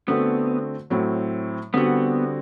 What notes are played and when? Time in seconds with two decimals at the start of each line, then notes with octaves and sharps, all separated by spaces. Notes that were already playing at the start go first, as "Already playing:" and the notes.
0.08 D3 A3 B3 C4 F#4
0.90 A2 F#3 C4 E4
1.74 D3 G3 B3 C4 F#4